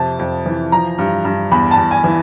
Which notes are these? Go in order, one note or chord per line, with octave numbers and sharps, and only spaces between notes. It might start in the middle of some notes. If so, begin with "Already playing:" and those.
Already playing: F2 C3 A5
F2
E3
F3 A#5
G2
G2
E2 B5
A5
E2
G#5
E3